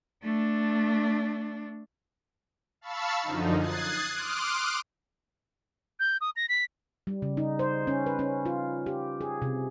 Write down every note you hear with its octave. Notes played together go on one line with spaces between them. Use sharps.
A3 D4
F5 A5 B5 C#6 E6
F#2 D3 F3 D#4
D#6 F#6 G#6 A6 C7
C6 D6 D#6 F6 F#6 D7
G6
D#6
A#6
B6
G3
C#3
D#4
C5
C#4
B4
C#4
F4
G4
G#4
C3